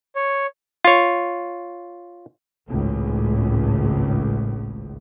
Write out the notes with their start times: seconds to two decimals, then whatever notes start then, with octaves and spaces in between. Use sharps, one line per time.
0.16 C#5
0.85 F4 C#5
2.68 G#1 C#2 A2